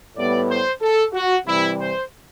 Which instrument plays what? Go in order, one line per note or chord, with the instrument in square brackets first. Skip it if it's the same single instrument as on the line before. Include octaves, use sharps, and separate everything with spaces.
[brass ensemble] A2 G3 B3 D5
C5
A4
F#4
C3 E3 G3 E4
C5